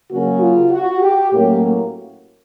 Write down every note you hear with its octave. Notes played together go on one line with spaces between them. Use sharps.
C#3 F#3 A#3 C#4 F#4
F4
F#4
G4
A2 F#3 A#3 C#4 G4